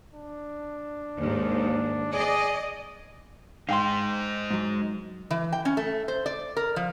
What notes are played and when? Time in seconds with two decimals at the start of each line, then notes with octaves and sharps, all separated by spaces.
0.14 D4
1.18 D#2 G#2
2.14 G#4 D5 D#5
3.69 G#3 D#4 F5 G5 C6
4.51 G#2 F#3
5.31 E3
5.52 G5
5.65 C#4
5.77 A3
6.08 C5
6.26 D5
6.57 A#4
6.76 F3